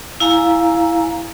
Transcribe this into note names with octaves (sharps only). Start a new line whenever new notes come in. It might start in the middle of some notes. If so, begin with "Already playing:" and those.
E4 F5 G#5 A#5